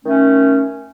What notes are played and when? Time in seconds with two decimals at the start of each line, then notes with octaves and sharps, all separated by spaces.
0.05 D#3 A3 C#4